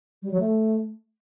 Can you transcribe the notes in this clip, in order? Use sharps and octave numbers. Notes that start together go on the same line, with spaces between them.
G3
F#3
A3